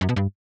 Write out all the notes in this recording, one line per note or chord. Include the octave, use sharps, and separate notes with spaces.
F#2
B2
G2